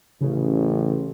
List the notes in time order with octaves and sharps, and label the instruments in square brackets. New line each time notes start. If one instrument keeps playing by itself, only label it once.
[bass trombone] A1 [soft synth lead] C#3